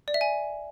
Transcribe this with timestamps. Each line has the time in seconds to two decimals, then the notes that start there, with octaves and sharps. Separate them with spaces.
0.08 D5
0.14 E5
0.21 G#5